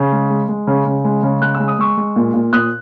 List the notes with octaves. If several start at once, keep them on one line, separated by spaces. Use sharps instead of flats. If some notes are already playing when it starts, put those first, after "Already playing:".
Already playing: C#3
G#3
G#3
G#3
C#3
C#3
G#3
C#3
G#3 F#6
G#3 E6
D#6
G#3 C#6 E6
G#3
A#2
A#2
A#2 D#6 F#6